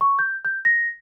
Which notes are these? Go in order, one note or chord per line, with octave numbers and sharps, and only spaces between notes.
C#6
G6
G6
A#6